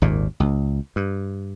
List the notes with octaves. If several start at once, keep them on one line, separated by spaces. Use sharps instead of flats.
G#1 D#2 A#2
C#2
G2